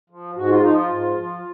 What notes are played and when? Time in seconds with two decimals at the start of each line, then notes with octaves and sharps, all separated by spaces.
0.10 F3
0.36 G#2 F#4
0.49 F4
0.62 F3 D#4
0.75 F4
0.89 G#2
1.17 F3